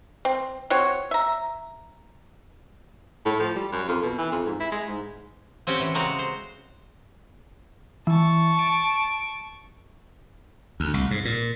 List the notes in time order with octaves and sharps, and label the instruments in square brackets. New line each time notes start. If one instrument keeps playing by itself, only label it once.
[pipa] C4
C4 F#4 C#5
E5 A#5
[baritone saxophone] A2
F3
G3
F#2
F2
B2
E3
F2
G#2
E4
G#3
G#2
[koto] C4 C#4 F#4 G4 G5
E3
C#3 G#3 C4 F#4 A#5
C5
[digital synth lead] E3 [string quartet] A5 C#6
[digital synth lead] D7
[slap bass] D2
C2
G#2
A#2